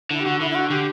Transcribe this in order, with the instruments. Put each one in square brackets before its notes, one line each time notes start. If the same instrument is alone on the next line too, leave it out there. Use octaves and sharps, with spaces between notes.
[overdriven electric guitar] D3 [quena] E4
[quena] G4
[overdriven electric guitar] D3 [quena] F#4
[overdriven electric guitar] D3 [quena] E4
[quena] E4
F#4
[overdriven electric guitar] D3 [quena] G4